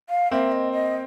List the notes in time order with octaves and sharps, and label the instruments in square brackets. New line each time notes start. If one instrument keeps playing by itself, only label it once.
[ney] F5
[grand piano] A#3 C4 [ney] E5
[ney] D#5
D#5